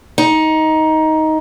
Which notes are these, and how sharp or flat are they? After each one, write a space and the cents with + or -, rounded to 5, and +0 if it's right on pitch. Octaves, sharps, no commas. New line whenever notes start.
D#4 +15